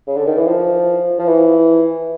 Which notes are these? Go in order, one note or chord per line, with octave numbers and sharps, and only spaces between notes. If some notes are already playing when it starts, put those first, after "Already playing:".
C#3
D3
D#3
E3
F3
F3
E3